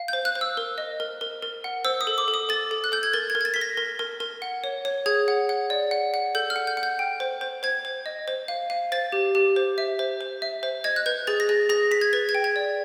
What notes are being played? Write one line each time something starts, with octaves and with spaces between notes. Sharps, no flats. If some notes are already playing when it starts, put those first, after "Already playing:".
Already playing: F5
C5 G6
F#6
C5
E6
A#4
D#5
A#4
A#4
A#4
F#5
C5 E6
D#6
A4
D6
A4
D#6
A4 A6
A4
F#6
A4 G6
G#6
A#4 A6
G#6
A#4
G#6
A6
A#4 B6
A#6
A#4
A#4
A#4
F#5
C#5
C#5
G#4 G#6
F#5
F#5
D5
F#5
F#5
A4 G6
F6
F#5
G6
F#5
G6
G5
C5
C5
C5 G#6
C5
D#5
C5
F5
F5
C5 A6
G4
G4
C5
E5
C5
C5
E5
C5
D#5 G#6
F#6
B4 G6
G#4 A6
A#6
G#4 A6
G#4 A#6
G#4 B6
G#6
B4 A6
G#6
G5
G#6
D5